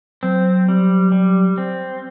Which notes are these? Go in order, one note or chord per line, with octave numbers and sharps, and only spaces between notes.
F#3 C4
G3
G3
C4